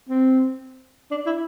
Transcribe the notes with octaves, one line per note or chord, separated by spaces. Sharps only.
C4
D4
E4